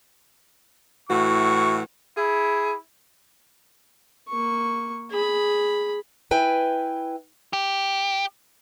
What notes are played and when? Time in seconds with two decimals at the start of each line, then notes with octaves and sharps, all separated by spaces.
1.09 A2 E3 F#4 C#6
2.18 E4 G#4
4.29 A#3 C#6
5.10 G#4 B5
6.31 E4 B4 G5 G#5
7.53 G4